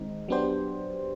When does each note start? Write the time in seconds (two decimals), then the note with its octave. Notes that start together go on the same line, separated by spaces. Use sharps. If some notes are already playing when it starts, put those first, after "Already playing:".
Already playing: D#3 G#3 C4 D#4
0.28 F#3 B3 D4 G4 C5